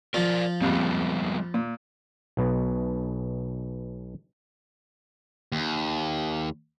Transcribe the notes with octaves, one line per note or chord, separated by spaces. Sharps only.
F3 F4 A#4 D5
A#1 F2 C3 G3 G#3 B3
A#2
B1 B2
D#2